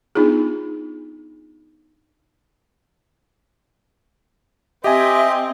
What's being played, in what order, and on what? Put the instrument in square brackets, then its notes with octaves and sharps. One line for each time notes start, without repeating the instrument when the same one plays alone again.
[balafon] B3 D4 D#4 F4 G#4
[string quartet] C4 [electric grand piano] G4 G#5 [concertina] D#5 [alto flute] E5